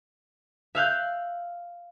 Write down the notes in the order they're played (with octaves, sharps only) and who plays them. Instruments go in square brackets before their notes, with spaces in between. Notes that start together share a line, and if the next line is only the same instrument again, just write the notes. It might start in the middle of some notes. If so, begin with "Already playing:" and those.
[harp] E5 F5 F#6 G6